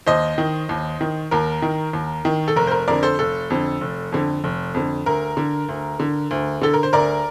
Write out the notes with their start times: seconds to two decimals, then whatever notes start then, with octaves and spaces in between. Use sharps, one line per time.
0.06 D#2 C5 D#5
0.38 D#3
0.69 D#2
1.01 D#3
1.31 D#2 A#4
1.62 D#3
1.93 D#2
2.25 D#3
2.48 A4
2.56 F1 A#4
2.67 C5
2.71 A#4
2.88 F2 D3 A#4 D5
3.03 A4 C5
3.19 F1 A4
3.50 F2 D3
3.81 F1
4.12 F2 D3
4.44 F1
4.74 F2 D3
5.06 D2 A#4
5.37 D3
5.69 D2
6.00 D3
6.31 D2
6.62 D3 A4
6.74 A#4
6.83 C5
6.93 D2 A#4 D5